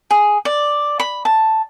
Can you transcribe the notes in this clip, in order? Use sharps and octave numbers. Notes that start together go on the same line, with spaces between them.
G#4
D5
B5
A5